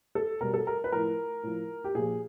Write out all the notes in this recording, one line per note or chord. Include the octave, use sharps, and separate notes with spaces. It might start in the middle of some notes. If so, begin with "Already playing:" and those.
A4
B2 G3 A#4
A4
A#4
B4
A2 F3 A#4
A2 F3
G4
A#2 F3 G#4